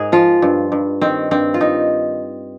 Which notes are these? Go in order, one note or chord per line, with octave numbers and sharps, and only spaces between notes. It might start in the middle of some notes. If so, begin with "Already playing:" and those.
Already playing: G#2 G#4 A#4
F3 F4
G2
G2
D#3 C4
G2 C4
F4
D#3 D#4